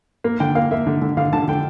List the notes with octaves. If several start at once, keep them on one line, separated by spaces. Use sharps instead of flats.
A#3
D3 G5
A#3 F5
A#3 E5
D3
D3
D3 F5
D3 A5
D3 G5